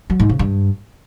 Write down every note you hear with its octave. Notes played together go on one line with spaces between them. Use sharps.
F#3
G#2
C#3
G2